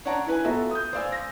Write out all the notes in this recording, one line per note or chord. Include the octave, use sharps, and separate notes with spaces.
D4 C#5 D5 F#5 A5 A#5
E4 B4 G#5
B3 F4 F#4 A4 E5 A#5
D#6 G6
C5 D5 F5 G#5 E6
A#6